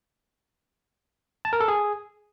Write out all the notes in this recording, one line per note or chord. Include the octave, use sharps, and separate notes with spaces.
A5
A#4
A4
G#4